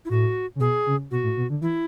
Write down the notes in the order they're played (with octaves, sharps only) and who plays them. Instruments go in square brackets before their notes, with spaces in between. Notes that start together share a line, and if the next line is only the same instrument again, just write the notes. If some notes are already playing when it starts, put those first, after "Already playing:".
[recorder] E4
[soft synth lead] A2 [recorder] F#4
[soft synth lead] C#3
[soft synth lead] B2 [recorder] G#4
[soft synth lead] C#3
[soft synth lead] B2 [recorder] F#4
[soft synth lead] A2
B2
D3
[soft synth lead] E3 [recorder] E4